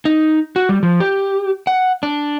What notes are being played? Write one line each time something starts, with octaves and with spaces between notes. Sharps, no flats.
D#4
F#4
G3
F3
G4
F#5
D4